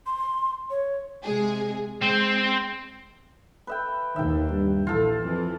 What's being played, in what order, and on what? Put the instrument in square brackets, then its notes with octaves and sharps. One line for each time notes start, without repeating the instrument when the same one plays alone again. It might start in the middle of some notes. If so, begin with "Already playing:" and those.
[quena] C6
C#5
[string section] C3 G#3 G#4
[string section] G#3 [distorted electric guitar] C4 C5
[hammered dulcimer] B4 E5 G5
[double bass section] D#2 [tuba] D#3 [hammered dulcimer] E5 G5
[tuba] G2
[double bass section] A#1 [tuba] E3 [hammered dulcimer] F4 A4
[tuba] F2 [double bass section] E3